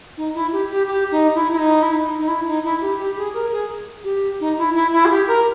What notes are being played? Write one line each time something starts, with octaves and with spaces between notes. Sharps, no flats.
D#4
E4
G4
G4
G4
D#4
E4
E4
D#4
E4
D#4
D#4
E4
D#4
E4
G4
G4
G#4
A#4
G#4
G4
D#4
E4
E4
E4
G#4
G4
A#4